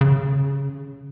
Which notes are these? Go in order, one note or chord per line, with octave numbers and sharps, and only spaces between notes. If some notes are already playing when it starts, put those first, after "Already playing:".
C#3